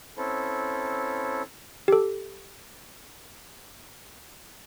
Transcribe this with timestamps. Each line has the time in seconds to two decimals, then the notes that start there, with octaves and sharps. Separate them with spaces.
0.17 C4 C#4 E4 A4
1.88 G4 A4